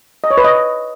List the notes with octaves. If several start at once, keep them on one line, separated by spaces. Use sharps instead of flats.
D#5
C#5
B4
D#5